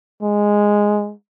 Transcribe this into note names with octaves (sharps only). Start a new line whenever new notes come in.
G#3